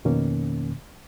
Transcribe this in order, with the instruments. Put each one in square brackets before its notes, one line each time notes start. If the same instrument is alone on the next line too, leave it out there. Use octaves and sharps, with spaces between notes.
[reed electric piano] F2 B2 D#3 A#3 C#4